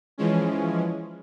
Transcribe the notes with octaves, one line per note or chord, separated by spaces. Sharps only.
E3 F3 G#3 C#4